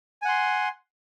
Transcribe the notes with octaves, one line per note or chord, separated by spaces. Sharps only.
F#5 G#5 C6